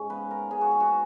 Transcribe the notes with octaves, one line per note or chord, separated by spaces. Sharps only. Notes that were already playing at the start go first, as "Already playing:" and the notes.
Already playing: G#2 C#4
C#3 G#3 B3 B4
A#4
C#3 G#3 B3 G#4
F#4
G#4
F#4